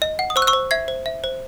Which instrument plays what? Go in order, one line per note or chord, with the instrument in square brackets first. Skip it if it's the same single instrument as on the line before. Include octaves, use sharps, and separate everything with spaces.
[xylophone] D#5
F#5
D#6
C5 C#6 E6
F#6
C#6 E6
C5
E5 G#6 C7
C5
E5
C5